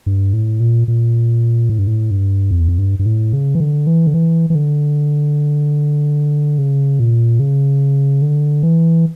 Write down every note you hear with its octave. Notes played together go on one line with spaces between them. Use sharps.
G2
A2
A#2
A#2
A2
G2
A2
G2
F2
E2
F2
G2
G2
A2
C#3
E3
D3
E3
D3
E3
E3
D3
C#3
A#2
C#3
D3
E3